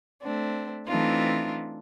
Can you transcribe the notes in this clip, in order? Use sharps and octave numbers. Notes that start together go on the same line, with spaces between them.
A3 C4 D4
E3 A3 C4 D4 D#4 F4